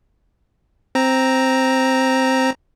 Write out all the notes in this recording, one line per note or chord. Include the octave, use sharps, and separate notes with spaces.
C4 A#5